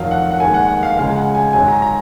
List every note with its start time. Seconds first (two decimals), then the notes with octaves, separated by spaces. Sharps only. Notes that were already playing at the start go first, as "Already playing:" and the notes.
Already playing: F1 F2 D#3 F#3 F5
0.11 F#5
0.31 F#5
0.39 D#2 D#3 G#3 G#5
0.54 F#5
0.68 F#5
0.83 F5
0.97 C#2 C#3 G#3 F5
1.16 F#5
1.35 G#5
1.53 G#1 G#2 F#3 G#5
1.68 A#5
1.82 A#5